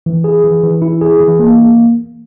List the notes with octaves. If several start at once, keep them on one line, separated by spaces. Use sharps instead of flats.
E3
G#4
E3
E3
E4
G#4
E3
A#3